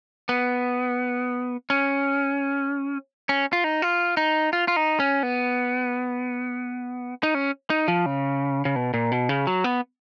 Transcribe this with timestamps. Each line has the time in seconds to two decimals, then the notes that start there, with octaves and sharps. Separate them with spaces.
0.29 B3
1.70 C#4
3.29 C#4
3.53 F4
3.64 D#4
3.82 F4
4.17 D#4
4.53 F4
4.68 F4
4.76 D#4
5.00 C#4
5.23 B3
7.23 D#4
7.35 C#4
7.70 D#4
7.88 F3
8.06 C#3
8.65 C#3
8.76 B2
8.94 A#2
9.12 B2
9.29 C#3
9.47 F#3
9.64 B3